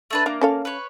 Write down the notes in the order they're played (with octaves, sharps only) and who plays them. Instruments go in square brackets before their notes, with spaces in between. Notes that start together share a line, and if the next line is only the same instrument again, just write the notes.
[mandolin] A3 D4 B4
[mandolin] A#3 [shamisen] D4
[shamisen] C#4 A4 F5
[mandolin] B4 C#5